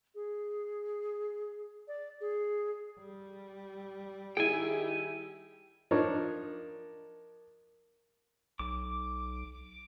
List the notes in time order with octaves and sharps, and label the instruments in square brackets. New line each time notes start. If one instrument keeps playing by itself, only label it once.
[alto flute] G#4
D5
G#4
[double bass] G3
[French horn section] D#3 G4 [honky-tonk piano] E4 G#4 [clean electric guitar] G5 G#5
[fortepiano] F3 D4 D#4 A#4 C#5
[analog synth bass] B1 [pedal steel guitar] D6